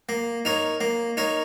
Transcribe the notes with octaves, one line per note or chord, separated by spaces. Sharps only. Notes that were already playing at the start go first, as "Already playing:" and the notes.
A#3
D#4 A#4 C#5
A#3
D#4 A#4 C#5